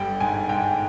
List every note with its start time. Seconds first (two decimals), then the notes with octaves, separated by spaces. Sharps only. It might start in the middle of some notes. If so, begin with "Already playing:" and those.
Already playing: G1 D3 G3 G5
0.20 G#2 G#5
0.49 G#2 G5